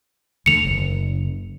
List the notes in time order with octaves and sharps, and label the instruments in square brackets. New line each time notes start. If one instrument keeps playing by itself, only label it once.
[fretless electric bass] E2 D3 A3 [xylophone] C#7 F7
[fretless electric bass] F#1